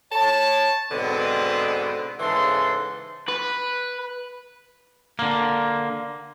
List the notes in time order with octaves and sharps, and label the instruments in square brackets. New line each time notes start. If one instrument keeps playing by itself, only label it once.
[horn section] C#5 A5
G#2 B2 D3 B3 C4
G#2 C#3 E3 A4 C6
[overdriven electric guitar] B4
[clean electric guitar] D3 A#3